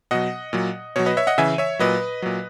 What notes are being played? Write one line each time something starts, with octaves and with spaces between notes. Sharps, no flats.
B2 F#3 D#5 F#5
A#2 F#3
B2 F#3 C#5
B4 D#5
C#5 E5
D#5 F#5
C#3 E3 E5 G#5
C#5 E5
A#2 F#3 B4 D#5
A#2 F#3